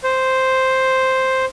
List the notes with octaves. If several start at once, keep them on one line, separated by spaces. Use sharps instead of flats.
C5